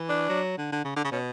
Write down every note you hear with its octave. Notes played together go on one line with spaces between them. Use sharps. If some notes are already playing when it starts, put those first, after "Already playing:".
Already playing: E3
D4
F#3
D3
D3
C#3
D3
C#3
B2 C#4